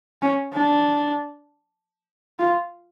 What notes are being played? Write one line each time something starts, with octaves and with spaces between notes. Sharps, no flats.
C#4
D4
F4